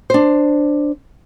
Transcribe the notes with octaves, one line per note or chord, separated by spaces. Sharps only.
D4 C5